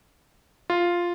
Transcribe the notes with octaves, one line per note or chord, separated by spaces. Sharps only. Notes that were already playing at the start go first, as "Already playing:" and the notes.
F4